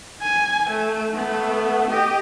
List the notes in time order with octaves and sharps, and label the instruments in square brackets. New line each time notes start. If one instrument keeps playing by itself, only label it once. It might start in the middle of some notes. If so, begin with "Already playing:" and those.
[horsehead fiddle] G#5
A3
A3 B3
G4 D#5